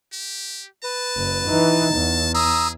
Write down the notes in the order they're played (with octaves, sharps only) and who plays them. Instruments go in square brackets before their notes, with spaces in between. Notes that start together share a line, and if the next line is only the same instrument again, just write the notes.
[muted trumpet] G4
[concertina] B4 [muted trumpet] A5
[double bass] F#1
E3 D#4
E2
[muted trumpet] G#4 [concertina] A#5 D#6 E6